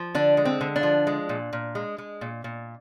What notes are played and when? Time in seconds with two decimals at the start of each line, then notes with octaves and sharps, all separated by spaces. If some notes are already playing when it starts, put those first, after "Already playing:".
Already playing: F3
0.15 D3 D4
0.37 G#3
0.45 C4
0.61 D3
0.76 D4
0.83 F3
1.07 G#3
1.29 A#2
1.53 A#2
1.75 G#3
1.98 G#3
2.21 A#2
2.44 A#2